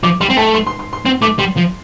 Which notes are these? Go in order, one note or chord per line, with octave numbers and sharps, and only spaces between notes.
F3 D6
G3 C6
C4 G5
A3 A5
C6
C6
C6
C6
C4 C6
A3 D6
G3 C6
F3